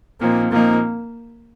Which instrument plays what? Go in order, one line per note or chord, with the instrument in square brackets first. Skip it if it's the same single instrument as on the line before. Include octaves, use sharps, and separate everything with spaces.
[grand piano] A#2 F3 C4 D#4 [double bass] A#3
[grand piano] A#2 F3 C4 D#4 [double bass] A#3